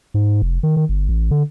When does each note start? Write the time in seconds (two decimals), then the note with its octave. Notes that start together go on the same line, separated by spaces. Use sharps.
0.14 G#2
0.42 F1
0.63 D#3
0.77 D#3
0.89 G1
1.09 A1
1.31 D3